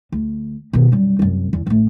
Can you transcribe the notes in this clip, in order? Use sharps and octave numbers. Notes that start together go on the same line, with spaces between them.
D2
B2 D#3
F#2 G3
C2 F#2
E2
A1 A2